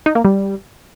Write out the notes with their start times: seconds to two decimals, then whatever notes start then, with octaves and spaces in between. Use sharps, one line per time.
0.06 D#4
0.15 A#3
0.25 G3